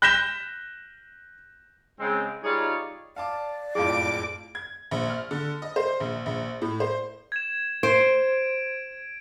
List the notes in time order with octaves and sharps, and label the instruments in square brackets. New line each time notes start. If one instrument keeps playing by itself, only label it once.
[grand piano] F#6 G6 A#6 B6 E7 G7
[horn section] C#3 G#3 C4
G3 D#4 F4 G#4 C#5 D5
[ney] D5 [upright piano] F5 A5 D6
[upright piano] F#1 F2 A2 [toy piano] G#4 F5 [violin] D6 D7
[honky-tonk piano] G#6
A#1
F6
D3
D#5
C5
A#1
A#1
A2
C5
[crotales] G#6 E7
[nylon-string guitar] C5 [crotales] D7